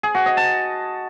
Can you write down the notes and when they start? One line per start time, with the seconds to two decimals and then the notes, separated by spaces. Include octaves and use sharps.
0.03 G#4
0.15 F#4
0.26 D#5
0.37 A5